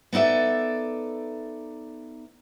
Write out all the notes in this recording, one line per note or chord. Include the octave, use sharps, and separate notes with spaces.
B3 D#4 A4 D5 E5